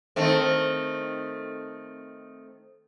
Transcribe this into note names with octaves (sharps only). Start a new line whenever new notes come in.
D#3 A3 C4